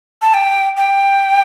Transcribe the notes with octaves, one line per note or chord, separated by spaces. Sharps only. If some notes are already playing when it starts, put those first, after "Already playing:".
A5
G5
G5